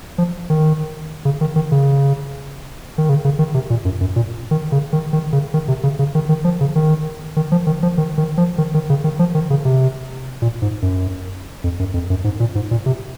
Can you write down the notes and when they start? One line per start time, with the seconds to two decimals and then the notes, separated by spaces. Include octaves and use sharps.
0.18 F3
0.50 D#3
1.25 C#3
1.41 D#3
1.56 D#3
1.72 C#3
2.98 D#3
3.09 C#3
3.24 C#3
3.39 D#3
3.54 C3
3.70 A#2
3.85 F#2
4.01 F#2
4.16 A#2
4.51 D#3
4.72 C#3
4.93 D#3
5.13 D#3
5.33 C#3
5.54 D#3
5.68 C3
5.83 C#3
5.99 C#3
6.15 D#3
6.29 D#3
6.44 F3
6.61 C#3
6.76 D#3
7.36 D#3
7.52 F3
7.67 D#3
7.83 F3
7.98 D#3
8.18 D#3
8.38 F3
8.58 D#3
8.74 D#3
8.90 C#3
9.04 D#3
9.19 F3
9.35 D#3
9.50 C#3
9.65 C3
10.42 A#2
10.62 G#2
10.82 F#2
11.64 F2
11.79 F#2
11.94 F2
12.10 F#2
12.24 G#2
12.40 A#2
12.55 G#2
12.71 A#2
12.86 C3